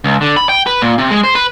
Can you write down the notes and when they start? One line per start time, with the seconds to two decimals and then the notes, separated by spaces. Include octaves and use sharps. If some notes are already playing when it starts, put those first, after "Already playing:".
0.04 C#2
0.21 D3
0.37 B5
0.49 G5
0.66 B4
0.82 A#2
0.98 C3
1.11 G#3
1.23 C5
1.35 B4